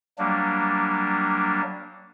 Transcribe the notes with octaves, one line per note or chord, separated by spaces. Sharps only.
F#3 G3 A#3 D4